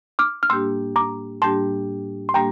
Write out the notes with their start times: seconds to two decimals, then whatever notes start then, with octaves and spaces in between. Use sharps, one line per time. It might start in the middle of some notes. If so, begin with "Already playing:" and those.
0.19 D6 F6
0.43 F6
0.50 A2 G3 A#3 D4 G4 C6 E6
0.96 A#5 D6
1.42 A2 G3 A#3 D4 G4 A5 C6
2.29 C6
2.34 A2 G3 A#3 D4 G4 G5 A#5